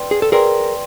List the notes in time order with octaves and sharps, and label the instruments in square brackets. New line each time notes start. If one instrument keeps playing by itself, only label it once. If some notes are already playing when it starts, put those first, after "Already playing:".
Already playing: [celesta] B4 D5 G5 C6
[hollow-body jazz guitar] G#4
A4
[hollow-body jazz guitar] G#4 A#4 [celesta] B4 D5 G5 C6